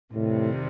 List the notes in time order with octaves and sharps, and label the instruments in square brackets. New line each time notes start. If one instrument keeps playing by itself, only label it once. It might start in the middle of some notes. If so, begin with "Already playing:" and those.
[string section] F2 C3 D#3 G3 [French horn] A2